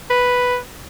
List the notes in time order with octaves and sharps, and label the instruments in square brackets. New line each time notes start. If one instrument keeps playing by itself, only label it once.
[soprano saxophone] B4